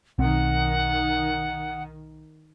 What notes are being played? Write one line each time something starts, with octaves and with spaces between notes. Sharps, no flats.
B1 D#3 C4 F#5